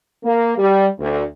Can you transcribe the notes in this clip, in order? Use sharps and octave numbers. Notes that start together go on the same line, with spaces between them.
A#3
G3
D2